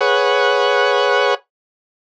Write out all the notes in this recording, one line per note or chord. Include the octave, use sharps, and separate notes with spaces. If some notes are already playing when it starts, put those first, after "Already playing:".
G#4 B4 C#5 F#5